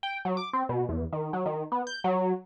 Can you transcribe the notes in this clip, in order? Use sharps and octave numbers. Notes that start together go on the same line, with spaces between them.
G5
F#3
D6
C4
B2
E2
D#3
F#3
D#3
B3
G6
F#3